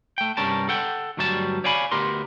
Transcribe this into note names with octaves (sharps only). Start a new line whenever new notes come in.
A3 G5
C2 G2 G3 C#4 A#4 A5
A4 F#5 G5
D2 G2 F#3 G3 G4 A5
C#5 D5 F5 G#5 B5
D2 B3 G4 A#4 C6